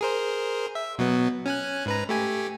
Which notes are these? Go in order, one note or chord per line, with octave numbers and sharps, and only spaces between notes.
G#4 A#4 C5
E5
B2 F#3 B3
C#4 G#5 F#6
G#2 B4 A#5
A3 G4 G#5